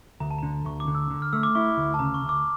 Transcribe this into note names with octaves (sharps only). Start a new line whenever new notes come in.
D2 A#5
A5
D3 A#5
D2 C#6
D6
D3
E6
D3
F6
A3 E6
D6
E4 C#6
D2
A5
C#3 A#5
C#6
D2
D6